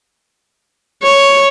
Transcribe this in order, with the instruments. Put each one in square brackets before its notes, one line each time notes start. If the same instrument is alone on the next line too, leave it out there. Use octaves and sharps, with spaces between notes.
[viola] C#5